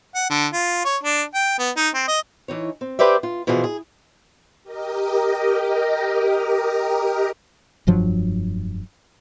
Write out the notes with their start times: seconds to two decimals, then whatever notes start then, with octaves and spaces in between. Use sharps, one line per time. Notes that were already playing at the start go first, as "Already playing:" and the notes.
0.15 F#5
0.30 D3
0.53 F4
0.85 C#5
1.04 D4
1.35 G5
1.59 B3
1.77 D#4
1.95 C4
2.08 D#5
2.48 E3 D#4 C#5
2.81 C4
2.99 G4 B4 C5 D5 E5
3.23 F4
3.47 B2 E3 F3 F4 G#4
3.64 G#4
4.63 G4 A#4 D#5
7.87 F1 G2 F3 F#3